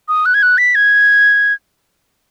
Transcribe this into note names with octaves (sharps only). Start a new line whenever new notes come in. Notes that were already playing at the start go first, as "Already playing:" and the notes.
D#6
F#6
G#6
F#6
B6
G#6